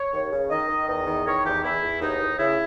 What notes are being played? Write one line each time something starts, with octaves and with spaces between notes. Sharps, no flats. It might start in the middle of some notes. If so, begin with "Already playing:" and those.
Already playing: C#5
D#2
C#3
D#3 D#5
D#3
E2 D#5
D#3
D#3 C#5
E2 G4
E2 E4
E2
D#2 D#4
D#2
C#3 E4